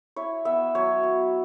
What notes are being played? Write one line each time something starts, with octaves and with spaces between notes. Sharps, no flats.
E4 C#5
B3 E5
F#3 C#5
B3